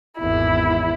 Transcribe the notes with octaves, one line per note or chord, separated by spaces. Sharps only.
G#1 E2 E4